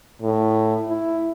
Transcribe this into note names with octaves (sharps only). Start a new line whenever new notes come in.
A2
E4